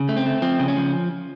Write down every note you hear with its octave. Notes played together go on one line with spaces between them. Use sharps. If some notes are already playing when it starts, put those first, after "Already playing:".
Already playing: C#3
A3
C4
A3
F3 C4
C#3
C#4
F3